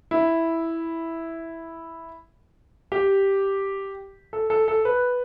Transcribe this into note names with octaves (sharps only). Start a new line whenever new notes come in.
E4
G4
A4
A4
A4
B4